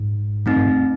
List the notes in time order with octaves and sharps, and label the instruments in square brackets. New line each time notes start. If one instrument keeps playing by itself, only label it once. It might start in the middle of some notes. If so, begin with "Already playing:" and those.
Already playing: [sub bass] G#2
[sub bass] G2 [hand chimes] A3 C4 D#4
[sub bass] G2
F#2